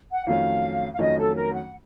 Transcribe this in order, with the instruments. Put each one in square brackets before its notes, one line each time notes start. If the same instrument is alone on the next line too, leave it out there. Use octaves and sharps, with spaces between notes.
[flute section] F#5
[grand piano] F2 D#3 F#3 A3 C#4 [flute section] F5
[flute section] F5
[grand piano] F2 D#3 F#3 A3 C#4 [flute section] D#5
[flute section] A4
A#4
F#5